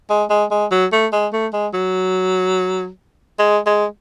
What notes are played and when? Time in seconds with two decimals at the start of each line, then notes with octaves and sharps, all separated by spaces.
0.10 G#3
0.30 G#3
0.51 G#3
0.71 F#3
0.92 A3
1.12 G#3
1.33 A3
1.53 G#3
1.74 F#3
3.39 G#3
3.66 G#3